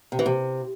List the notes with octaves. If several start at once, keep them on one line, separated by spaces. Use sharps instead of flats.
C3
E3
C3